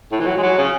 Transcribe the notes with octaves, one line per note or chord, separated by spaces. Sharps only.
A2
E3
F#3
G#3
F#3
C#3